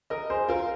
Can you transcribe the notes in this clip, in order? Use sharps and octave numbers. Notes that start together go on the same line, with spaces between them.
A#4 D#5
G#4 C5
F4 A#4